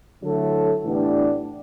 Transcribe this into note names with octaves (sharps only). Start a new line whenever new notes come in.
D3 F#3 A3 E4 A4
A2 E3 B3 D4 G4